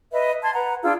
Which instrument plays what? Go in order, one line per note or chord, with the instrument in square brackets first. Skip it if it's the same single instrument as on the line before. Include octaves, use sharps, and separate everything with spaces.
[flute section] B4 D#5 E5
A5 C6 G#6
B4 F#5 A#5
D4 F4 G#4 E6